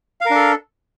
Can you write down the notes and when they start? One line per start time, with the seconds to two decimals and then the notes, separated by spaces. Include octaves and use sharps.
0.21 F5
0.26 A#4
0.30 D4
0.35 A4